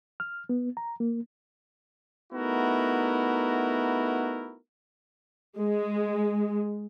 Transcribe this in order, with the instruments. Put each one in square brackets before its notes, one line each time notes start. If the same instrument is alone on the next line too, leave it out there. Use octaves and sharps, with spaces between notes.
[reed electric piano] F6
B3
A#5
A#3
[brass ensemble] A3 B3 D#4 E4 F#4 A#4
[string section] G#3